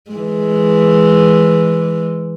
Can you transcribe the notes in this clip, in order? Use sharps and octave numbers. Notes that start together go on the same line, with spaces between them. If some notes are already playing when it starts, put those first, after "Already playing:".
E3 G#3